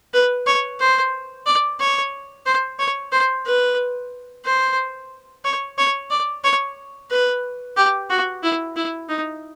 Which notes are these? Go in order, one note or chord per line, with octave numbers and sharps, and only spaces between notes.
B4
C#5
C5
D5
C#5
C5
C#5
C5
B4
C5
C#5
C#5
D5
C#5
B4
G4
F#4
E4
E4
D#4